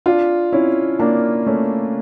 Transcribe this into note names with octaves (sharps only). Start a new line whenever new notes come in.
D4 F4
C#4 E4
A#3 D4
A3 C#4